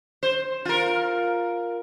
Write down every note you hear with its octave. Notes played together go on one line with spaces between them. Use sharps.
C5
F4 A#4